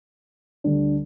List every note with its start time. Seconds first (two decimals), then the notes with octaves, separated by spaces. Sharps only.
0.64 D2 D3 G3 D4